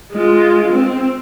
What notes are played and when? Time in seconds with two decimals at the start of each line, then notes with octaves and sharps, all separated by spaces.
0.13 G#3 F4
0.73 C4